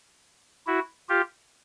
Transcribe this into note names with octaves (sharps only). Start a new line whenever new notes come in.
E4 F#4
F4 G4